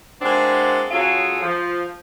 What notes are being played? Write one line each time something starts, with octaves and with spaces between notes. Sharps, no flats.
G#3 A#3 C4 D4 E4 F#4
F#3 C#4 F4 F#4 G#4 A4
F3